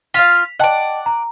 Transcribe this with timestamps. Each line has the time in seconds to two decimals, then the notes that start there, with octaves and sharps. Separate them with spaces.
0.14 F4 F5 B6 F7
0.59 D5 D#5 F#5 G5 A5
1.06 A#5